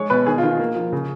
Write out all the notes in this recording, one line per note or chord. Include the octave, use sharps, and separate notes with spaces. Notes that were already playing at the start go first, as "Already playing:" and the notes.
Already playing: G#3 C#5
B2 B4
D#3 G#4
F4
D#3
A#3
F3
C#3